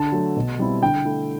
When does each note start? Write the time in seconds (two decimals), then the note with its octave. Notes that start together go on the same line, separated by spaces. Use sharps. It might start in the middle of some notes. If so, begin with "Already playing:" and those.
Already playing: D3 A5
0.12 F#3 A3
0.36 B2
0.59 G3 C4 E4
0.82 D3 G5
1.05 A3 E4